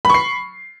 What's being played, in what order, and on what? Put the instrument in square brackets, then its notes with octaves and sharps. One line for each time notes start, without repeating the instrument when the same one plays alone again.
[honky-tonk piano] B5
C#6
C7